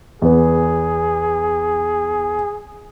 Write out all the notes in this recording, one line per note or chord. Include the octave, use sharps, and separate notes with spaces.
E2 B3 G#4